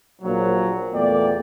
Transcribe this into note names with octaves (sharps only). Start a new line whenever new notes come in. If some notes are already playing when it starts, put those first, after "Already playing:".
A#1 A#2 F3 F#3
E2 A#2 A3 B3 D5 G5